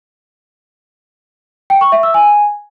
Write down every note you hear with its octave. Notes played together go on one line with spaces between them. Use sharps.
G5
C#6
E5
E6
G#5